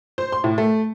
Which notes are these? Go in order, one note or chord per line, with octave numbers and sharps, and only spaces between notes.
C5
C6
A2
A3